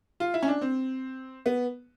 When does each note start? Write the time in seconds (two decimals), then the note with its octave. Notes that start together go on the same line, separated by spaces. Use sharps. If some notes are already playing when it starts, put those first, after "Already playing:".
0.20 F4
0.34 E4
0.43 C#4
0.48 D4
0.62 C4
1.46 B3